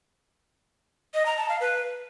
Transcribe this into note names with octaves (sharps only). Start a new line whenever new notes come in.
D#5
A#5
A5
F5
B4